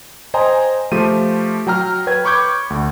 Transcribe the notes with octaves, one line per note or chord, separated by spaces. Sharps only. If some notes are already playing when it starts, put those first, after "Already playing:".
C5 D#5 G5 G#5 A#5 C6
F3 A3 F4 G4 D#7
F#3 G5 A#5 F6
B4 C#5 G5 G#6
B5 C#6 D6 G6 G#6
D2